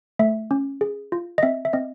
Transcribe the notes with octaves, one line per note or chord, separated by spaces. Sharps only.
A3 E5
C#4
G#4
F4
D#5
C4 E5
E5
C4 D#5